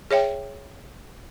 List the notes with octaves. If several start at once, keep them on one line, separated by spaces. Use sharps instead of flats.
G#4 C#5 E5 G5